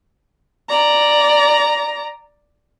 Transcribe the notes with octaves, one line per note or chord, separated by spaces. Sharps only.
D5 A#5